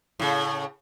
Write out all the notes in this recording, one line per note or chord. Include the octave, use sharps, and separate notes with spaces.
A2 C#3